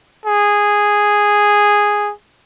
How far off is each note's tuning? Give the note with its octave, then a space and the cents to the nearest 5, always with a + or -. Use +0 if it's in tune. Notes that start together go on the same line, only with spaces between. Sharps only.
G#4 -5